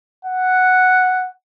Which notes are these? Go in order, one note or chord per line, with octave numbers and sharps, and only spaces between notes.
F#5